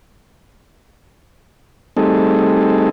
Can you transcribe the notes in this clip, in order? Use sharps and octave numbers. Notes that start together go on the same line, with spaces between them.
G3 A3 C4 D#4 G#4 A4